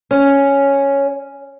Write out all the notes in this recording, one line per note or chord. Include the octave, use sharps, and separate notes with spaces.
C#4